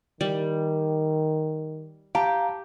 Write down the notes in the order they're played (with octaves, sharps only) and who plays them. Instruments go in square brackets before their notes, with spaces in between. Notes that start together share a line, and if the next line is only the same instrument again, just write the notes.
[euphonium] D#3 [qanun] G3
[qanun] G4 [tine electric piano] F5 A5 A#5